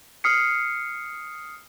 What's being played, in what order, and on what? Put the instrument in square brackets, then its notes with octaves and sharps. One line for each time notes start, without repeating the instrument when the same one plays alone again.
[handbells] D#6 F6 C7 C#7